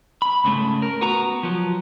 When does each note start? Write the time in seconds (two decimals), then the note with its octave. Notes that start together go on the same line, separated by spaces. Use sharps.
0.22 B5
0.44 C#2 G#2 C#3 G#3 A3
0.82 A#4
1.01 B3 F#4 A#5
1.43 F3 F#3